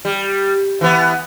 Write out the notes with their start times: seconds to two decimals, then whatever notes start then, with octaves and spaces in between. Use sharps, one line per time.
0.05 G3
0.81 E3 B3